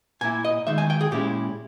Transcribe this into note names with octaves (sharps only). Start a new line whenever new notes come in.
A#2 A#3 E4 G#5
D#5
D#3 G#3 D#4 E5
G#5
G5
G#4
A#2 G#3 C#4 E4 G4